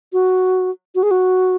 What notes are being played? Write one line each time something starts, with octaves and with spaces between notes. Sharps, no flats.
F#4
F#4
G#4
F#4